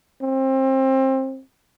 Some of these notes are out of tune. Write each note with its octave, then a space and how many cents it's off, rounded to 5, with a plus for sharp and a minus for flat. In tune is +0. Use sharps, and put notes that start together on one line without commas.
C4 +25